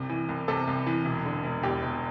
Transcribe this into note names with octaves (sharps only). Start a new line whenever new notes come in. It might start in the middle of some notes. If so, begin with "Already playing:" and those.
Already playing: C2 C3
E3
C2
C3 A4
C2
E3
E1
D3
E1
E2 G4
E1